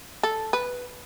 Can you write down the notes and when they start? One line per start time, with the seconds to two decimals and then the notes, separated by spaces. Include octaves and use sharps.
0.23 A4
0.53 B4